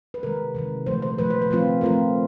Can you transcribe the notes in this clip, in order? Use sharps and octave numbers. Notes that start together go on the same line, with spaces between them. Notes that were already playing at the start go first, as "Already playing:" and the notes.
B4
C3 D#3 G#3 A#4
C3 D#3 G#3
A#2 F3 A3 C5
C5
A#2 F3 A3 B4
C5
B4
F3 A3 C4 F4
F3 A3 C4 F4 A#4